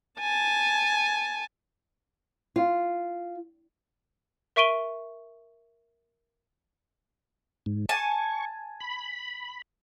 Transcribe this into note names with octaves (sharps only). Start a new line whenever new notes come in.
G#5 A5
F4
A#4 E5 C#6 D7 D#7 G7
G#2
G#5 A5 C#6
B5